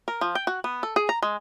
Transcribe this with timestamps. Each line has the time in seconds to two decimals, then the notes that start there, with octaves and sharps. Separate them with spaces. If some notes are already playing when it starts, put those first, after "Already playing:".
0.08 A#4
0.21 F3
0.35 G5
0.47 F#4
0.64 B3
0.83 A4
0.96 G#4
1.09 A#5
1.23 G#3